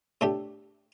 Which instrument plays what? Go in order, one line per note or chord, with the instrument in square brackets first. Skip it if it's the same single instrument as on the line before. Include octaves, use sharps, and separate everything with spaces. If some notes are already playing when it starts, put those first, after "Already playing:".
[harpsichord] A2 A3 D4 G4